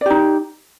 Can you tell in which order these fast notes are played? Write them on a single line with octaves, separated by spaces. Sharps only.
D5 G4 D#4